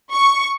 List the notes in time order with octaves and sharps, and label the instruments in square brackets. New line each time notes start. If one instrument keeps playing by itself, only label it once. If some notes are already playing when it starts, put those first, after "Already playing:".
[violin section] C#6